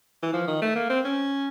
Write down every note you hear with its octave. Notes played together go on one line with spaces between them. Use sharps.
E3
F3
D#3
A3
A#3
C4
C#4